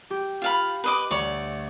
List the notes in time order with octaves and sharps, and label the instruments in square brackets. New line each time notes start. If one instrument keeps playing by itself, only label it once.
[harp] G4
[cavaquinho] F4 F5 B5
B4 D#5 D6
[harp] D2 [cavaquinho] C#5 D5